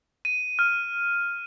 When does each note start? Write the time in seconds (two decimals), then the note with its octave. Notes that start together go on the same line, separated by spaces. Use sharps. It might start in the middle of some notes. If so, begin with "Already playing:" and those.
0.25 D#7
0.59 F6